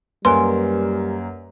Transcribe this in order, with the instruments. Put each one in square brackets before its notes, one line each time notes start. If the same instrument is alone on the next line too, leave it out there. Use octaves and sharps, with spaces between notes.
[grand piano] F#2 A#3 [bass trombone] G3 [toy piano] B4 D#5 G#5 [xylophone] C6